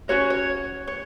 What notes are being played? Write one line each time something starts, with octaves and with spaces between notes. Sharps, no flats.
C#4 F#4 A#4 C#5
C#5
C#5